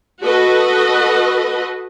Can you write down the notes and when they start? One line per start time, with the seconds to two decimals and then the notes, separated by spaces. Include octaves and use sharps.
0.21 F#4 A4 B4 D#5